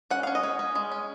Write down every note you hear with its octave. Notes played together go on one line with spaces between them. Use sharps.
C#4 F#5
C#4 F5
D#5
C#4
C#4
G#3
C#4